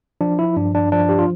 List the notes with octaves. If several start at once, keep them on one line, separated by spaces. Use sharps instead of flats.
F3 D4
E4
G2 D4
D4
F3 D4
G4
F4